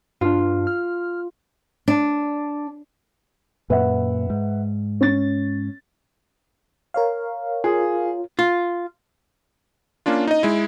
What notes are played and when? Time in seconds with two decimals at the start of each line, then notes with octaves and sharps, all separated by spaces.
0.21 G2 D4 F4
0.67 F6
1.88 D4
3.70 F#2 A#2 B4 E5 F#5
4.30 G#2
5.01 C#4 A6
6.94 A#4 C#5 F5
7.64 F4 G#4
8.39 F4
10.06 A#3 C#4 D4 F4
10.27 D#4 D#5
10.43 G#3 E4